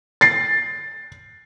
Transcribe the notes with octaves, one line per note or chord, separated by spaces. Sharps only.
A6 C7